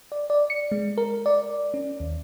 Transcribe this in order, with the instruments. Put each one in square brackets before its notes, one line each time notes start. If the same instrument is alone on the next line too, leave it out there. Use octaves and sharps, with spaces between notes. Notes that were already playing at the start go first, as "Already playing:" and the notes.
[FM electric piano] D5
D5
C#7
G#3
A#4
D5
C#4
D#2